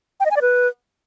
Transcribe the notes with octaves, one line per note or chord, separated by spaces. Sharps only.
G5
D#5
G#5
D5
B4